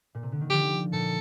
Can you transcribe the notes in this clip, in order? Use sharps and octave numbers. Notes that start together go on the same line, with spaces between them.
A#2
C3
D3
D#3
D3 F3 G4
A#2 D3 A4